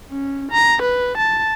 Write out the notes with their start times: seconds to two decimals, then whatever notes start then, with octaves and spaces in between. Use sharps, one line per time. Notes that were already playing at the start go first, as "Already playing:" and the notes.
0.11 C#4
0.51 A#5
0.82 B4
1.18 A5